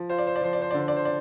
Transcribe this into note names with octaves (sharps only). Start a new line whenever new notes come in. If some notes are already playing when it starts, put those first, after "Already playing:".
Already playing: F3
F4 C5
D5
C5
D5
F3 C5
D5
C5
D3 D5
C5
D5
C5
D5